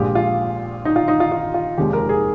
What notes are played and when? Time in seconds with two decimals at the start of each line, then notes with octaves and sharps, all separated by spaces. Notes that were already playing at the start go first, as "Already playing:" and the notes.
Already playing: A#1 A#2 G#3 G4
0.15 F4
0.85 D#4
0.96 F4
1.08 D#4
1.20 F4
1.32 F4
1.54 F4
1.78 F1 D#2 D#3 G#3 G4
1.93 A#4
2.09 G#4